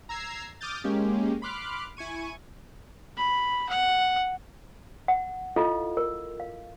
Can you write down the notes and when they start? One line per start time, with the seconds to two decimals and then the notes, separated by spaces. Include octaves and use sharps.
0.09 A#5 E6 G#6 C7
0.61 D6 D#6 F6 G6 A6
0.84 G#3 A#3 C#4 G4
1.42 B5 C6 D6 F6 F#6
1.97 E4 G#5 C#6 D#7
3.17 B5
3.69 F#5
5.08 F#5
5.56 E4 F4 A4 D#5 F5
5.97 A#4
6.40 F5